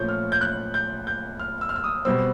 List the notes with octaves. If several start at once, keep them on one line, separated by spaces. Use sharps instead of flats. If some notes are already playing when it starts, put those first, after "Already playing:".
Already playing: A#2 F3 A3 C#4 G6
F6
G6
F#6
G6
G6
F6
E6
F6
E6
D#6
B2 G3 C4 E6